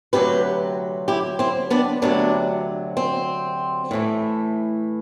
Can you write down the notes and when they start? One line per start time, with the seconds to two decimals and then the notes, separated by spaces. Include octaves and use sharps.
0.13 D2 C3 F#3 G4 B4
1.08 E4 G4
1.39 C4 E4
1.70 B3 D4
2.02 D2 C3 F#3 B3 D4
2.97 C4
3.91 A2 E3 A3